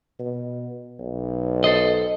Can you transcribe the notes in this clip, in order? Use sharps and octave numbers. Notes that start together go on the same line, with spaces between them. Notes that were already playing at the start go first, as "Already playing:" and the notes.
B2
B1
A4 C5 D#5